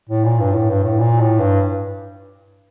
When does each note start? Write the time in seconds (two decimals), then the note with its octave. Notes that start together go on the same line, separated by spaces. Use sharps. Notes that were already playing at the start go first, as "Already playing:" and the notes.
0.09 A2
0.25 A#2
0.40 G2
0.54 A2
0.70 G2
0.84 A2
0.99 A#2
1.20 A2
1.40 G2